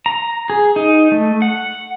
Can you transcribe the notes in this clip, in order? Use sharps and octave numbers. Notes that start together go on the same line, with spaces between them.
A#5
G#4
D#4
A3
F#5